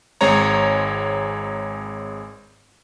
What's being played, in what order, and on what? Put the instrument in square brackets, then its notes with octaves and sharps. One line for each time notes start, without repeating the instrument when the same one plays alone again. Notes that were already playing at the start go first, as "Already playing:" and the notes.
[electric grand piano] G#1 G#3 C4 C#5 A#5